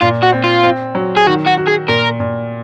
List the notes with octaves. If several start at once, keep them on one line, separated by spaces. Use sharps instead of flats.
A#2 F4
F#4
C4
F4
C4
F#3
G#4
D#3 F#4
F#4
F#4
G#4
A#2 A#4
A#2